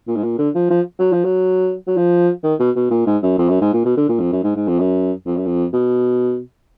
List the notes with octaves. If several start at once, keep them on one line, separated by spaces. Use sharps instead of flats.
A#2
G#2
A#2
D3
F3
F3
F#3
F3
F#3
F#3
F3
D#3
B2
B2
A#2
G#2
F#2
F2
F#2
G#2
A#2
B2
D3
A#2
F2
F#2
G#2
G#2
F2
F#2
F2
F#2
F2
B2